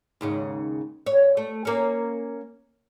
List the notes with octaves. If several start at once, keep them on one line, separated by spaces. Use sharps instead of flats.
D#2 G#2 C#3
C#5
A3
A#3 C#4